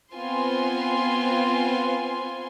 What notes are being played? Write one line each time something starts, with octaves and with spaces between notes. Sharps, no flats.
B3 C4 F4 G#5 C6